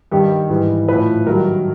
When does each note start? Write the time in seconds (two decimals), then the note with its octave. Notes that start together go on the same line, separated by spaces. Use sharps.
0.11 G2 D#3 G3 G4
0.49 G#2 E3 G3
0.88 A2 F3 B4
1.26 G2 D#3 F#3 A#4